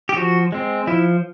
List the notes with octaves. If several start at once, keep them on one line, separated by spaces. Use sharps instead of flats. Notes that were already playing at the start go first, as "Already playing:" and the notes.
G4
F3 F#4
G#3 C4
F3 E4